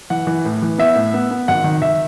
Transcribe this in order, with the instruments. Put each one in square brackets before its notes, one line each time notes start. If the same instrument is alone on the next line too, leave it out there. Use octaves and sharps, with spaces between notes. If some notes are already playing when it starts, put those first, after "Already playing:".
[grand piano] E3 F#5
E3
A2
E3
B3 E5
A2
B3
B3
G#1 F#5
D#3
D#3 E5